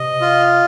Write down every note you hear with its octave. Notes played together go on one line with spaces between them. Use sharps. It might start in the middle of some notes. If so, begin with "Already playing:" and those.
Already playing: C3 D#5
F4